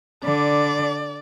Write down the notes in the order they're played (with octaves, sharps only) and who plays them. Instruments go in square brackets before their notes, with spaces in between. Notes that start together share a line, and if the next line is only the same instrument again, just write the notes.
[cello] D3 [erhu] D5